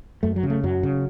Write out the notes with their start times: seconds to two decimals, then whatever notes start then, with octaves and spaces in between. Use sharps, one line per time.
0.23 F#2 A3
0.36 F#3
0.43 C#3
0.50 A3
0.63 F#2 F#3
0.83 C#3